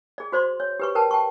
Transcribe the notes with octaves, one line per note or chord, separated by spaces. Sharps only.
G#4 D5
F#4 C5 D5 C6
C#5
G4 B4 C#6
A#4 B4 G5 A5
G5 A5 C#6